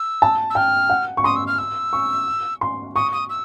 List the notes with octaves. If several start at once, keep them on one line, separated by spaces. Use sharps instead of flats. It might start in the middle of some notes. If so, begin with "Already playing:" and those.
Already playing: E6
A5
E6
G5 F6
F#5
C#6
C6 D#6
E6
F6
E6
C#6
C6
C#6 D#6
D#6
E6